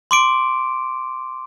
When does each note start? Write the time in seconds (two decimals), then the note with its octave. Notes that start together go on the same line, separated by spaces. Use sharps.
0.11 C6 D6 D7